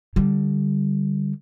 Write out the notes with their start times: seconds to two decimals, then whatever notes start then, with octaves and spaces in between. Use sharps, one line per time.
0.16 D3 G3